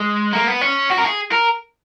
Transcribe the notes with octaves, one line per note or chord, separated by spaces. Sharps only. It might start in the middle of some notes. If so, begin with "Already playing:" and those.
Already playing: G#3
A#3
B3
C#4
F#4
A#4
G#4
A#4